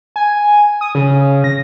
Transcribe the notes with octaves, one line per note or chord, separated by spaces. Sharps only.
G#5
D#6
C#3
A#6